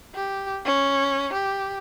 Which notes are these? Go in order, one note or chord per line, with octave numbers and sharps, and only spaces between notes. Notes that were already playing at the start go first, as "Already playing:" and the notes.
G4
C#4
G4